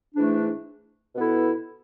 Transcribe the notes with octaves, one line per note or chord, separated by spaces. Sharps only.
G#2 E3 A3 D4
B2 B3 E4 A4